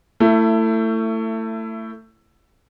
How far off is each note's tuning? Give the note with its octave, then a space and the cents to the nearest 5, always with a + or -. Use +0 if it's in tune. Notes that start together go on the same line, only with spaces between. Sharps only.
A3 +25 E4 +15